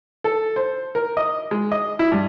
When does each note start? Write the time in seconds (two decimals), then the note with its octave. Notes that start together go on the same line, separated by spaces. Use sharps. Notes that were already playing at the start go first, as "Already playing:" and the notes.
0.24 A4
0.56 C5
0.95 A#4
1.17 D#5
1.51 G#3
1.72 D#5
1.99 E4
2.12 G2